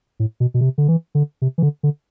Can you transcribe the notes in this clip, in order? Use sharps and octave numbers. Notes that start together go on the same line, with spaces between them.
A2
B2
B2
C3
D3
E3
D3
C3
E3
D3
D3